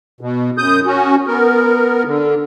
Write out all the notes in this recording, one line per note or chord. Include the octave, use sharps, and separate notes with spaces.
B2
F#2 D#6 G6
C#4 F#4
B3 A#4
D3